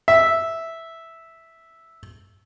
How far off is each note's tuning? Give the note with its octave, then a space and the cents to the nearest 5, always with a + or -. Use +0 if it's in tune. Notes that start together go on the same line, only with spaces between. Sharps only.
E5 -5